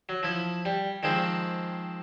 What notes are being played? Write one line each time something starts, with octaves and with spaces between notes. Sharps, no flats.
F#3
F3 E4
G3
D#3 F3 G#3 C4